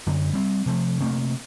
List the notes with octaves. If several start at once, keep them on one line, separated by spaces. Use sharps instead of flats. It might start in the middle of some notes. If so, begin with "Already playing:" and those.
F#2 D3
G3 C4
C3 F3 A3
C3 A3 A#3